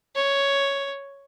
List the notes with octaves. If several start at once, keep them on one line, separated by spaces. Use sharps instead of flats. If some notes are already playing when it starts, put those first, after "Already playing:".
C#5